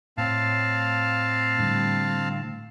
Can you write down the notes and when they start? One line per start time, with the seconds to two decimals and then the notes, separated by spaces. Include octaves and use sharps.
0.17 A2 C4 C#5 F5 A5
1.59 A2 D3 G3